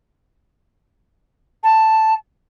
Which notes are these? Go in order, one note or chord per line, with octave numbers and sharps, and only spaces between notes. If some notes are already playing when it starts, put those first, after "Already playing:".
A5